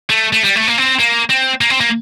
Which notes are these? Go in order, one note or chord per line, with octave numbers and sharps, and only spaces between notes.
A3
A3
G3
A3
A#3
C4
A#3
C4
A#3
C4
A#3